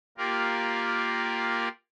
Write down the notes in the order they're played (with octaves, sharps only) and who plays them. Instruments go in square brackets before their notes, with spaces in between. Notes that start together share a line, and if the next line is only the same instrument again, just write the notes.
[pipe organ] A#3 F4 G4 A#4 D5